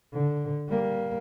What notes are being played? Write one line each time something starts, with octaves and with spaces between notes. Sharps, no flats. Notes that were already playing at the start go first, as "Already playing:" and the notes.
D3
G3 A#3